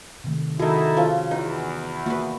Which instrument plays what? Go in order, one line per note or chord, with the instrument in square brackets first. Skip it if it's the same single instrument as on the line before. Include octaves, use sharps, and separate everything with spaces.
[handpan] C3 D#3 A3
[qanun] D#3 G#4 [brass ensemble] D#4 E4 A4 [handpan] F#4
[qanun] C#3 F3
[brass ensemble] E2 [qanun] D#4
[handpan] A#3 [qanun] F#4 B4